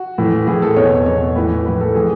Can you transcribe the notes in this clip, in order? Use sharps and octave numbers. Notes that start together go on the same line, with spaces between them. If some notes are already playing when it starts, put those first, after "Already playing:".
Already playing: F#4
A2 E3
A2 E3 G#4
A4
E2 B2 C#5
E2 B2 C#5
A2 E3 B4
A2 E3 B4
A4
A2 E3 G#4